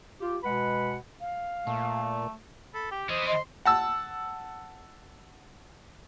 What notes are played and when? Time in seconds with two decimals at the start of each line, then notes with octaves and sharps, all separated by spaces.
0.21 F4 G4
0.44 B2 G#3 B4 F#5 B5
1.21 F5
1.67 A#2 A3
2.74 A4 B5
2.91 G4 G5
3.09 E3 G#4 C5 D#5
3.27 D#5 C6
3.65 F#5 A5 E6